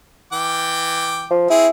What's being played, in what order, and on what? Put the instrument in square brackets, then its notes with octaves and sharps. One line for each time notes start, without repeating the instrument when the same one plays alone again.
[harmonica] E3 G5 D6
[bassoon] F3
[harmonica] C4 G#4 [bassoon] E4